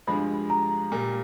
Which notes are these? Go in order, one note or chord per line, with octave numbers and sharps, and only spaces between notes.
G2 D3 F3 G#3 B5
A#5
A#2 G3 A#3